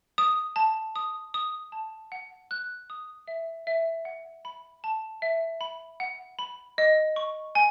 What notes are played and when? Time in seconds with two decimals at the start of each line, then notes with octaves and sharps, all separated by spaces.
0.18 D#6
0.56 A5
0.96 D#6
1.34 D#6
1.72 A5
2.12 F#5
2.51 F#6
2.90 D#6
3.28 E5
3.67 E5
4.05 F#5
4.45 B5
4.84 A5
5.22 E5
5.61 B5
6.00 F#5
6.39 B5
6.78 D#5
7.16 C#6
7.55 G#5